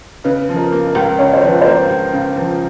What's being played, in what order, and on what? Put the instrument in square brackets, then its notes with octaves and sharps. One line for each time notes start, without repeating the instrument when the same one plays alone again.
[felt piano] C#3 [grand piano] B4
[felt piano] F3
[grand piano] A#4
[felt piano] A#3
[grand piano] A#4
[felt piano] C#2
[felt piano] C#3 [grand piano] C#5
[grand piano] C5
[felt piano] F3 [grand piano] B4
[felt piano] A#3 [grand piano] C5
[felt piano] C#2
C#3
F3